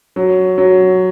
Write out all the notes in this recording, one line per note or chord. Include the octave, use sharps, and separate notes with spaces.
F#3
F#3